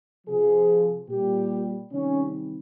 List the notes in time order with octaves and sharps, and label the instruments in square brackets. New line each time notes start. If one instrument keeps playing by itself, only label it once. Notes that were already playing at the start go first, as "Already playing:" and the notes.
[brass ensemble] C3 F3 G#4
A#2 G3 G4
C3 D#3 G3 C#4